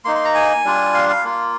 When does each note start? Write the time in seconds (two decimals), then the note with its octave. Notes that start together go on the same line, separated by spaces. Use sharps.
0.05 A#3 D#4 C6
0.15 C6
0.25 A#5
0.35 G#5
0.64 G3 D4 F4
0.94 F5
1.09 F5
1.24 A#3 F4